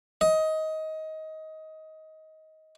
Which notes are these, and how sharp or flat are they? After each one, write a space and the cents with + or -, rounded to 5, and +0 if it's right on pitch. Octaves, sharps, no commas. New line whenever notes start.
D#5 +20